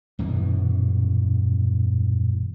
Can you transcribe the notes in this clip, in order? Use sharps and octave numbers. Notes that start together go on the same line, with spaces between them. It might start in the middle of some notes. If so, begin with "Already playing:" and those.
D#1 F#2 B2 E3